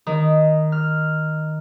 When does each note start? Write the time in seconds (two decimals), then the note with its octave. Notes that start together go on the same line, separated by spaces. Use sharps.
0.07 D#3
0.72 F6